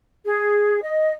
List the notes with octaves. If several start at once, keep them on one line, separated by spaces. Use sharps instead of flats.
G#4
D#5